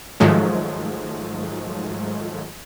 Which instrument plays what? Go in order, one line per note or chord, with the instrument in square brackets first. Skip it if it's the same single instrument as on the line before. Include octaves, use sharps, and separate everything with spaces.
[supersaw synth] G#2 D#3 F3 F#3 G#3 A3